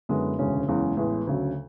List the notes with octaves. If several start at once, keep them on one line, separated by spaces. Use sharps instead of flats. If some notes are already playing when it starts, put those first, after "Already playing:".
F#2 D3 G#3 B3 E4
E1 D2 C#3 G#3 C#4
F#1 E2 C#3 G#3
A1 A2 G#3 B3
D2 C#3 F#3